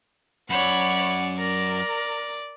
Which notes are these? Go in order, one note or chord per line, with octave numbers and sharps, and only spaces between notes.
F#2 C#5 D5 F#5 B5
A#4 D5